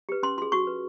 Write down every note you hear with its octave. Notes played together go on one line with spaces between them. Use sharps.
G4 B4
C#4 C6
F4 G#4 C6
F#4 C#6
B4